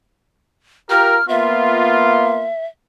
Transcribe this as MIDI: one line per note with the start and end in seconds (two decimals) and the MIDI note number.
0.90 1.18 65
0.90 1.18 67
0.90 1.18 70
0.90 1.27 89
1.29 2.47 58
1.29 2.47 59
1.29 2.47 65
1.29 2.66 76